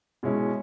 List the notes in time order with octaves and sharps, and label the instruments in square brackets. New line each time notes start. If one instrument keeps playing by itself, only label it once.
[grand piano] B2 G#3 C#4 E4